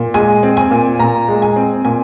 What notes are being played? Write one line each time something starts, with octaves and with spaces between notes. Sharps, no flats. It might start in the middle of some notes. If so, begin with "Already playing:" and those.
Already playing: A#2
G#3 G#5
C4
G#5
A#2
A#2 A#5
G#3
G#5
C4
A#2 G#5